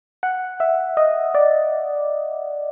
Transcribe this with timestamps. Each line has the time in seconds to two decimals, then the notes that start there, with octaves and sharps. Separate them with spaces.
0.23 F#5
0.60 E5
0.97 D#5
1.35 D5